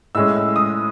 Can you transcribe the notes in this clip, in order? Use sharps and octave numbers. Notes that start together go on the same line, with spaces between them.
A2 G#3 C#4 E6
E6
D#6